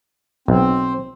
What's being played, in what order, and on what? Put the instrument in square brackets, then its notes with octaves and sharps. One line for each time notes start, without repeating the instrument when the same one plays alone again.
[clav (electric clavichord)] B1 [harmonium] C4